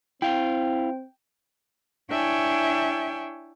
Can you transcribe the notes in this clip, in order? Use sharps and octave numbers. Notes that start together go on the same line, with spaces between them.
C4 E4 F5 G5
D4 E4 C#5 E5 G5 G#5